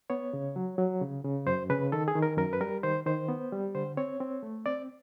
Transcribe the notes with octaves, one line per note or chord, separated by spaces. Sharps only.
B3 C#5
C#3
F#3
F#3
C#3
C#3
F#2 C5
C#3 B4
D#3 A4
G#4
D#3
A#4
F#2 A#4
B4
G3 A#4
D#3 C5
D#3 C5
B3
G3
D3 C5
C4 C#5
C4
A3
C4 D5